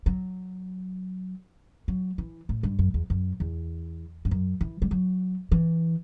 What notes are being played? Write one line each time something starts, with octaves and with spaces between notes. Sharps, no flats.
F#3
F#3
E3
A2
G2
F#2
E2
F#2
E2
G2
F#2
E3
G3
F#3
E3